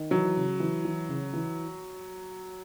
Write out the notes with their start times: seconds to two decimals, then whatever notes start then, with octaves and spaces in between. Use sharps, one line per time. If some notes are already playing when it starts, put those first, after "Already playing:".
Already playing: D#3
0.11 E3 F#3
0.37 C#3
0.60 E3
0.85 E3
1.09 C#3
1.33 E3